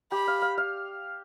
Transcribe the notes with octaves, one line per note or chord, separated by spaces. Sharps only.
G4 B5
F5
F5
F5